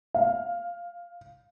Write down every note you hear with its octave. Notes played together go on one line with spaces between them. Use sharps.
F5